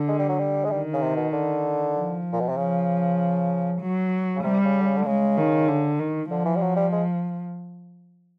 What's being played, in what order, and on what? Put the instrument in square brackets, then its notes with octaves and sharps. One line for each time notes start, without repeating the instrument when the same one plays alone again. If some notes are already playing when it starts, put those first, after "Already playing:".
Already playing: [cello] D3
[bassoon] G#3
G3
F#3
G3
G#3
[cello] D#3 [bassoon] G3
[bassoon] C#3
C3
B2
D3
[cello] F3
[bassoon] A#2
B2
C3
[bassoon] C#3 [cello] F3
[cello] F#3
[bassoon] C#3
[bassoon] C3 [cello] G3
[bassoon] C#3
D3
C#3
D3
[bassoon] C#3 [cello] G#3
[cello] D#3
D3
D#3
[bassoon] D3 [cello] F3
[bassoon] E3
G3
F#3
G3
G#3